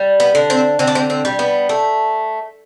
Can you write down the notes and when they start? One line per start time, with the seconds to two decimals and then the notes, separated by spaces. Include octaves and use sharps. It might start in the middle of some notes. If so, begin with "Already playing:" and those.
Already playing: G3
0.20 B3
0.35 D3
0.50 C4
0.79 D3 C4
0.87 D4
0.95 C4
1.10 C4
1.25 G3
1.39 B3
1.69 A3